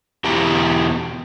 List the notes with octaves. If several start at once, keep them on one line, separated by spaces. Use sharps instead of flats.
E2 B2 E4 G4 A#5